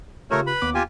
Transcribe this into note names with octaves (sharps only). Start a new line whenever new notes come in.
C#3 A3 F4 G4 A#4 C#5
B4 B5
D#2 B3 D6
F4 G4 G#5